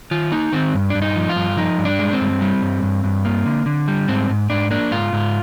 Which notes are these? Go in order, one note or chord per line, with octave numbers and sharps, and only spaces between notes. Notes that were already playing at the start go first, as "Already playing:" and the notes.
D#3 F4
A#3 D#4
D#3 C4
G2
G2 D4
D#4
F3
F4
G2
F3 D#4
G2
D4
G#3
C4
G2
G3
G2
G2
G2
A#3
D3
D3
G3
G#2 C4
G#2
G#2 D4
A#3 D4
G#2 F4
G#2